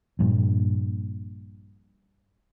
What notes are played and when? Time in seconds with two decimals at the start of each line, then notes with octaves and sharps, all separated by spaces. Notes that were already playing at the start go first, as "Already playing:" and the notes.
0.19 A#1 G2 A#2